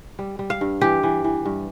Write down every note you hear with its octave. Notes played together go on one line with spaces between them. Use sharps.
G3
G3
F5
G2
E3 G4
E3
E3
G2